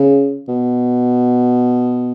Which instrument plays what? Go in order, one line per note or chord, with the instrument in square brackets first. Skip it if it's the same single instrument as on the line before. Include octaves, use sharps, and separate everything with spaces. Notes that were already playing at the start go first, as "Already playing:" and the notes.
Already playing: [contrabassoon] C#3
B2